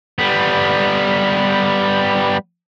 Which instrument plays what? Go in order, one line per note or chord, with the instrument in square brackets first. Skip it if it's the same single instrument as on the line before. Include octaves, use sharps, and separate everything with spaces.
[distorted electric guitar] G3 B3